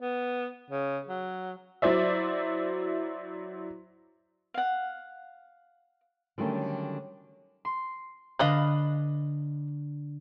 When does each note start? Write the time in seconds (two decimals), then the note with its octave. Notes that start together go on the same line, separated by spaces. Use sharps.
0.01 B3
0.71 C#3
1.08 F#3
1.82 F#3 E4 C5 D5 E5
4.54 F5 F#5
6.38 D3 D#3 F#3 G3 A3 C#4
7.65 C6
8.39 D3 D4 B4 D#5 F5 F#6